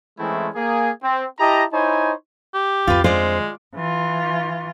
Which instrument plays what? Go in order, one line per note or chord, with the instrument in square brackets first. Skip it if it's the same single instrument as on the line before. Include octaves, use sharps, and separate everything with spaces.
[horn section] E3 G#3 A3 C4 C#4 E4
A#3 G#4
C4
E4 G4 D#5 A5 A#5
D#4 E4 C5 C#5 G#5 B5
[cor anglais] G4
[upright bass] F2 D3 [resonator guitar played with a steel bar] F4 B4
[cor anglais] G#3 [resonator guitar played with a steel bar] F4 D5 [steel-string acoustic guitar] C5
[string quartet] E3 F4